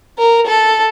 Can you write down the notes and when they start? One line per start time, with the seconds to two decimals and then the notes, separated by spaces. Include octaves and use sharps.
0.19 A#4
0.47 A4